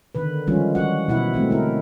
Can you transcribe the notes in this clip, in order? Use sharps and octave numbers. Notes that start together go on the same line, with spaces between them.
D3 D#3 B4
D#3 F3 G3 G#3 C#4 F4
E3 F#4 F#5
B2 E4 F#5
F#3 G#3 A3 C4
D3 E4 A#4